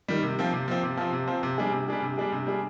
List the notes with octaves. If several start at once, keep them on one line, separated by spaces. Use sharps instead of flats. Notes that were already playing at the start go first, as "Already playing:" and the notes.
D#3 G3
C3
F3 C4
C3
F3 C4
C3
F3 C4
C3
F3 C4
C3
G3 D4 G#4
C3
G3 D4 G#4
C3
G3 D4 G#4
C3
G3 D4 G#4